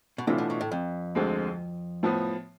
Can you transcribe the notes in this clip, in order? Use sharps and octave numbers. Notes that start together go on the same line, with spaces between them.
B2
A2 C3 E3 A3 D4 F4
B2
B2
A2
F2
D2 D3 G#3 C4
A2 F3 B3